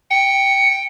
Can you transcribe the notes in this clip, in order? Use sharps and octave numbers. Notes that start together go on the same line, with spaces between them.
G5 C#7